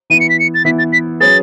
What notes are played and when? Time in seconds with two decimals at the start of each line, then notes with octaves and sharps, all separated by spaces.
0.10 E3 B3 E4 D#7
0.20 C#7
0.29 B6
0.40 C#7
0.54 A6
0.65 E3 B3 E4 B6
0.78 A6
0.93 B6
1.20 F#3 C#4 G#4 B4 A6